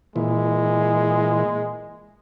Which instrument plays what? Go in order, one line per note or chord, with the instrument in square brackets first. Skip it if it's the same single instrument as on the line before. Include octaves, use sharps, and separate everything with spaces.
[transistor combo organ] A#2 E3 [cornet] G#3